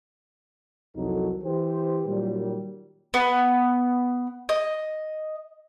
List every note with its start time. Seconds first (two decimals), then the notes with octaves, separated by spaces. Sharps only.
0.95 C2 F2 D#3 F#3 D#4 A4
1.44 E3 G4 C5
2.06 A#2 D#3 F#3 G3
3.14 B3
4.49 D#5